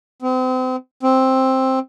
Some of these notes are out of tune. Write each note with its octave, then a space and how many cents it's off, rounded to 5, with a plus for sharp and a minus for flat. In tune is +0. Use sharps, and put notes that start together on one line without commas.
C4 -35
C4 +5